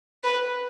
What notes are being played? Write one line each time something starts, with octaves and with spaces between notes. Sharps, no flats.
B4